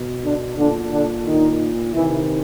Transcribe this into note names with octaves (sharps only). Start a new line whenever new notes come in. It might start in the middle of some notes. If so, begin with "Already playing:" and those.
Already playing: B2
D3 D4
A#2 D3 D4
D3 D4
D#3 D#4
C3 D#3 E3 E4